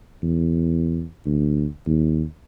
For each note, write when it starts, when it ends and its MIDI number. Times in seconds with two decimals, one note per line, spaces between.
0.22 1.05 40
1.26 1.66 38
1.87 2.24 39